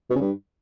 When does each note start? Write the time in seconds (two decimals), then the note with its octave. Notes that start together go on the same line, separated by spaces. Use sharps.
0.10 B2
0.16 C#3
0.21 G2